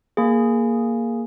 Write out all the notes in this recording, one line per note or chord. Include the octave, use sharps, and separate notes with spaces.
A#3 G#4